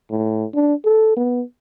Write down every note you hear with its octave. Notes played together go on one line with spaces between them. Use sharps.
A2
D4
A4
B3